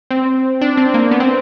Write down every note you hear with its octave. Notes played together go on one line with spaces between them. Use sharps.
C4
D4
C4
A#3
B3
C4